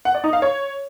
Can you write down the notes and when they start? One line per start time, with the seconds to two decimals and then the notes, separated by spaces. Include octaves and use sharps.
0.05 F#5
0.15 D5
0.24 D#4
0.33 F5
0.42 C#5